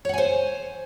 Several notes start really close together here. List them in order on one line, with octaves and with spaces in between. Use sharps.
C#5 F#5 G#5 C5